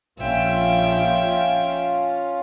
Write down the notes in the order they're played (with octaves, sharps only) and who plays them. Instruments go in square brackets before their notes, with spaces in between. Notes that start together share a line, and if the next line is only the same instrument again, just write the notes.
[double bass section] A#1 [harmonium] C#4 F4 [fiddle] E5 G5